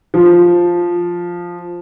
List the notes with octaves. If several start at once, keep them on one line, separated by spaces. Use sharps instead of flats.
F3